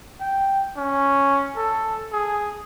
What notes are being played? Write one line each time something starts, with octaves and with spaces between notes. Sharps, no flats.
G5
C#4
A4
G#4